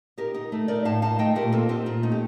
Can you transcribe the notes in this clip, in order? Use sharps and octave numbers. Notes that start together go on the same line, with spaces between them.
D#4 G4 A#4
D#4
A3
D#4 A#4 D5
A2 F5 A5
D#4 F5 A5
A3 D#5 G5
A#2 G4 A#4
C4 F4 A4
C4 D#4 G4
A#2 F4
A3 D#4
G4